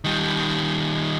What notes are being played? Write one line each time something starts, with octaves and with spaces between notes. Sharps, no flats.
D#3 G3